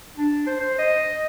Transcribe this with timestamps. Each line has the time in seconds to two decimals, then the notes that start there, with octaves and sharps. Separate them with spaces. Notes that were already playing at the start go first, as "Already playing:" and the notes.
0.18 D4
0.47 C5
0.60 C5
0.79 D#5